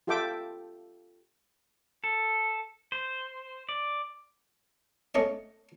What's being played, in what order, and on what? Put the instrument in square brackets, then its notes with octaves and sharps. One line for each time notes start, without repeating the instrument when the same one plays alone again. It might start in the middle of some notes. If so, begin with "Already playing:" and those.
[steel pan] F4 G4 A4 E5 G5 D6
[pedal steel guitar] A4
C5
D5
[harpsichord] A3 C#4 C#5 D#5